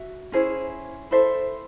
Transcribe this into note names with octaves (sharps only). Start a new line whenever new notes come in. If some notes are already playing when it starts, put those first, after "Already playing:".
Already playing: F#4 E5
C#4 E4 G#4 C5
E4 A4 C5 E5